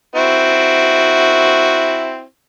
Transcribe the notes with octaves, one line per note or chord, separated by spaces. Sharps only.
C4 E4 F#4